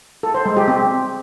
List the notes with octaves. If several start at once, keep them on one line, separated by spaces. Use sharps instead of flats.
A4
C5
G#3
G4
C4